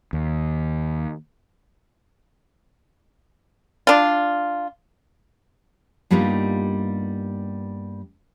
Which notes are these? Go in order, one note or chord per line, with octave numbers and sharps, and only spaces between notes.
D#2
D4 F4
G2 G3 A#3 B3 D#4 F4